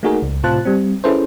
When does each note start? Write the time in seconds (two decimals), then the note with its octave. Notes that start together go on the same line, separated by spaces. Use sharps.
0.03 A3 A#3 D#4 F#4 G#4 A#4
0.22 C#2
0.43 A2 C3 F4 C5 A5 F#6
0.65 G3 C4
1.04 C#4 E4 G#4 A4 B4 C5